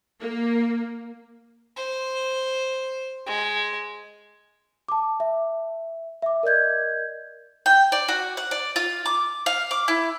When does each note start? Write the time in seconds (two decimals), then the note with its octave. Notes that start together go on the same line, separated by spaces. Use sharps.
0.20 A#3
1.77 C5
3.27 G#3
4.88 A5 D6
5.20 E5
6.22 E5 D6
6.43 A#4 D5 D#5 G6 G#6
7.66 G5
7.92 D5
8.08 F#4
8.37 F#5
8.51 D5
8.76 F4
9.06 D6
9.46 F5
9.71 D6
9.88 E4